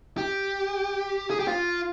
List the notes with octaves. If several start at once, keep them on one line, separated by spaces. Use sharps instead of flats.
G4
G#4
G4
F4